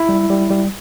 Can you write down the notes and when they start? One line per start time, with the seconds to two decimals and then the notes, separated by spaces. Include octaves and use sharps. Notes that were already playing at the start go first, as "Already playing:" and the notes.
Already playing: E4
0.09 G3
0.30 G3
0.50 G3